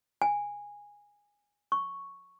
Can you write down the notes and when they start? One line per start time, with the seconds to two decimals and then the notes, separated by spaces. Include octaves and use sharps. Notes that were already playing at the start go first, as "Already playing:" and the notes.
0.22 G#5
1.72 C#6